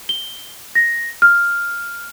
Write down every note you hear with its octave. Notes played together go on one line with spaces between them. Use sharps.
G7
A#6
F6